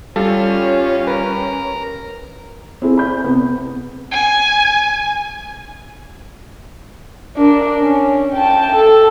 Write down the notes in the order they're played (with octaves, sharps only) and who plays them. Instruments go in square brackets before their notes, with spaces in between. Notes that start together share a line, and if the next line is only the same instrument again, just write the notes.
[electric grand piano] G3 [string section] C#4 [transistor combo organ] F4 [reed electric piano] A4
[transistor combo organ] A#4 [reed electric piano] B4
[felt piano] C4 E4 G#4
B5 G6
C3 B3
[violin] G#5
[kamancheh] D4 A#4
C#4
G5 A5
A4